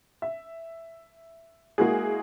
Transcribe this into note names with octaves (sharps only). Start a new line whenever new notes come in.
E5
G#3 A#3 E4 F#4 G#4